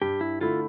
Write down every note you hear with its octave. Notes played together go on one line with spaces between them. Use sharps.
G2 G4
E4
D3 A3 E4 F4